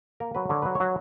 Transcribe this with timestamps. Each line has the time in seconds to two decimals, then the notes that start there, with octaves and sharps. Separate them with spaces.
0.20 A#3 A#4
0.35 F#3 B4
0.49 D3 C#5
0.62 F#3 B4
0.75 C#5
0.80 F#3